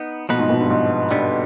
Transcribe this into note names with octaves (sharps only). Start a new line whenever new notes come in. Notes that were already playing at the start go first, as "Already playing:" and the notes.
Already playing: B3 D#4
B2 F3 B3 D#4 B4
G#2
B2
G2
G#2
G2 D3 G3 B3